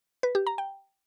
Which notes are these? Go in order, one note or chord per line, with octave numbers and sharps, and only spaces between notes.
B4
G4
A#5
G5